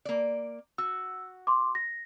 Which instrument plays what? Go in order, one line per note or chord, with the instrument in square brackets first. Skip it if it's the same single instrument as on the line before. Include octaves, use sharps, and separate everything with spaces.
[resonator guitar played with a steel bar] A#3 D5
[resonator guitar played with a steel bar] F#4 [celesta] E6
[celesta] C6 D6
A#6